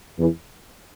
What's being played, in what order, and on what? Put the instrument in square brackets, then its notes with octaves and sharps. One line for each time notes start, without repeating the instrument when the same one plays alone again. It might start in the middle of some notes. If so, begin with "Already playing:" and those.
[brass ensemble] E2 E3